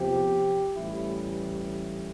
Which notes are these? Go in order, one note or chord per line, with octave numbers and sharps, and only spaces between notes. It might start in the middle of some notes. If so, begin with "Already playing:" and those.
Already playing: E2 C3 F3 G4
A1 A2 E3 G3 E4